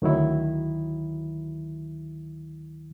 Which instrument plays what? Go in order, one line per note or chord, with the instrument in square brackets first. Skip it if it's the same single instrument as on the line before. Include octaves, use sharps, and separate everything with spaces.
[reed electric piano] D2 D#3 F#3 E4